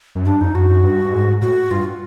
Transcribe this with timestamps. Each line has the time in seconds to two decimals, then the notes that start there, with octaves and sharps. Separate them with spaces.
0.15 F#2
0.25 G2 D4
0.41 F2 D#4
0.54 F#2 F#4
0.69 F#2
0.83 G2
1.05 G2
1.12 G#2
1.41 A2 F#4
1.70 G2 F4